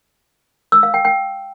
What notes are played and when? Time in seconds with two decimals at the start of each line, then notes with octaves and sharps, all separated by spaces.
0.72 E6
0.83 F5
0.94 G5
1.05 G5